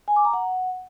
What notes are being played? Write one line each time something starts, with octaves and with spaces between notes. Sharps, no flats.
G#5
D6
A#5
F#5